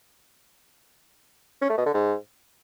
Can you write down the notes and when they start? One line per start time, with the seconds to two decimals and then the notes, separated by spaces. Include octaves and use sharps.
1.62 C#4
1.70 A3
1.78 B2
1.86 D3
1.94 G#2